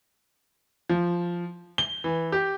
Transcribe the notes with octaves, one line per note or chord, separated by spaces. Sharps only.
F3
G7
E3
G4